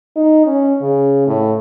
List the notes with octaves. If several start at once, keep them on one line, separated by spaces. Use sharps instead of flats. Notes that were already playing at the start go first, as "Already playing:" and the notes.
D#4
C#4
C#3
A2